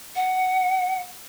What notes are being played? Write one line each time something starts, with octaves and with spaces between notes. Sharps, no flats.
F#5